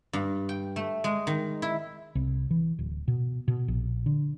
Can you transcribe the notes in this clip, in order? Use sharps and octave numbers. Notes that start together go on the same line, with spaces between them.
G2
G5
A3
G#3
D#3
E4
C2
E3
D1
B2
B2
A#1
D3